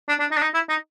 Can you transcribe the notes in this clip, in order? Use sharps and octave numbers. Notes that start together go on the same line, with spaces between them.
D4
D4
D#4
D4
D#4
E4
D#4